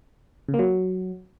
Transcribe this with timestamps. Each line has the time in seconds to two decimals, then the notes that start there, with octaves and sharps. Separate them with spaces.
0.48 C#3
0.54 A#3
0.59 F#3